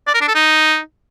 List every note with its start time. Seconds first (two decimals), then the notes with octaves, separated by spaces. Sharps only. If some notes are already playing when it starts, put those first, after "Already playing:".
0.07 D5
0.14 A#4
0.21 D4
0.28 A4
0.35 D#4